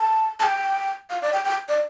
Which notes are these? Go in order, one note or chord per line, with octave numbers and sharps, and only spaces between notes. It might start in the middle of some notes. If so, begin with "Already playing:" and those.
Already playing: A5
A5
G5
F5
D5
G5
G5
D5